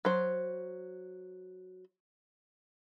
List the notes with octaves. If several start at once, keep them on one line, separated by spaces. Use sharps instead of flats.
F#3 C5